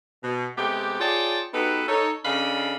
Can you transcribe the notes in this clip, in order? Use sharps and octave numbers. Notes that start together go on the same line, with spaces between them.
B2
C3 G#3 A3 B3 G4
F4 G#4 C#5 D5 G5 A5
B3 D#4 F#4 G4 A4 B4
D#4 A4 C#5
C#3 D4 A4 D#5 F5 B5